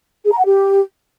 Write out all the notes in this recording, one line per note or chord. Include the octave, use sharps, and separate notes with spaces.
G#4
A#5
F#5
G4